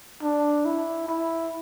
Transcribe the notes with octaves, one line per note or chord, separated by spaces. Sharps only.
D4
E4
E4